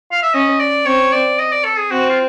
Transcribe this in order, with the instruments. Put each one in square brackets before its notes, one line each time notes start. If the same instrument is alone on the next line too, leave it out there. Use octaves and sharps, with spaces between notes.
[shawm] F5
E5
[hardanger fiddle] C#4 [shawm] D#5
[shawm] D5
[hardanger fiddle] C4 [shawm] C#5
[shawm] D5
D#5
D5
A4
G#4
[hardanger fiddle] C4 [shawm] F#4
[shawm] F4